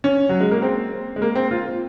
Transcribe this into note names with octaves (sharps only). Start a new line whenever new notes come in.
C#4
F#3
G#3
A#3
C4
G#3
A#3
C4
F4